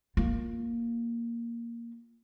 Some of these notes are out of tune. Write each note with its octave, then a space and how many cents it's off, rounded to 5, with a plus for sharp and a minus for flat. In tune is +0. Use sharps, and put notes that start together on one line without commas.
A#3 +0 F4 +0